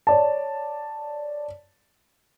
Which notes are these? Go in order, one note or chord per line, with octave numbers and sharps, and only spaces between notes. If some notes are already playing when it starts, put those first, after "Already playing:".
C#5 D5 A5